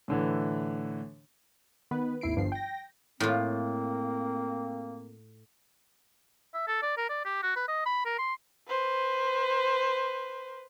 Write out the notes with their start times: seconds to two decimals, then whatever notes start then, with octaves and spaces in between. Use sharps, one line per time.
0.08 A2 D3 E3
1.91 D#3 B3 B4
2.21 G#1 D#2 E4 C7 D7
2.36 G1 G2 F3 C7
2.52 G5 A#6
3.20 A2 A#3 C4 F4
6.54 E5
6.67 A4
6.82 D5
6.97 A#4
7.09 D5
7.25 G4
7.43 F#4
7.56 B4
7.68 D#5
7.86 B5
8.05 A#4
8.18 C6
8.67 B4 C5